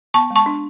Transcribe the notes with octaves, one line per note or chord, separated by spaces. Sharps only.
B3 A5 C#6
G#3
A5 C#6
D4